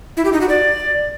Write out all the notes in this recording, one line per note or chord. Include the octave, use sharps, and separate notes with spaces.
E4
G4
D#4
F#4
D5